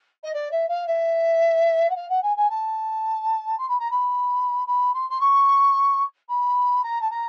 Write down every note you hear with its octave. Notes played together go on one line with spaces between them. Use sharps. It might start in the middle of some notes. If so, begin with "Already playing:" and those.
D#5
D5
E5
F5
E5
F#5
F5
F#5
G#5
G#5
A5
C6
B5
A#5
B5
B5
C6
C6
C#6
B5
A#5
A5
A#5